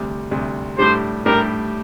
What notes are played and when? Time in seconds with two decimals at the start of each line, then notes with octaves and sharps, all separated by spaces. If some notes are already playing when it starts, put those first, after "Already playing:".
Already playing: D2 C3 G3
0.31 D2 C3 G3
0.78 A2 G3 D4 G4 C5
1.25 A2 G3 D4 G4 A#4